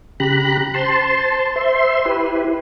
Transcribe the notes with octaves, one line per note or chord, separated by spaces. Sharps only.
C#3 G4 A#5 B5 F#6
C5 A5 C6
C5 E5 C6
E4 G4 B4